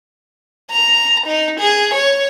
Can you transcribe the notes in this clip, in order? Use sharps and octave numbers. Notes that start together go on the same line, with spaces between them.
A#5
D#4
G#4
C#5